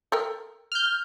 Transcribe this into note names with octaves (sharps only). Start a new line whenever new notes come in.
A4 A#4 G5
F6 G6